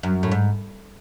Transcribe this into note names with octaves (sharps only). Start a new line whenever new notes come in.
F#2
A2
G#2